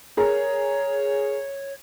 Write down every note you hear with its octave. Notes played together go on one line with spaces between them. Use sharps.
G#4 A#4 C#5 A#5